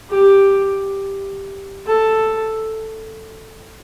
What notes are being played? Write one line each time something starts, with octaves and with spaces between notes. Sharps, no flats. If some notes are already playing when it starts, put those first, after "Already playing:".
G4
A4